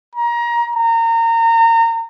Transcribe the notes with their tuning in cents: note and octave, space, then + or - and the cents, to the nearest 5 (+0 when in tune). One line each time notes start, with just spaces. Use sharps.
A#5 +25
A#5 -30